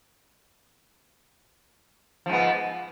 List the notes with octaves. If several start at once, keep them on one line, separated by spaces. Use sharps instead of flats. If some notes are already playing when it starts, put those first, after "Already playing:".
G#2 F3 B3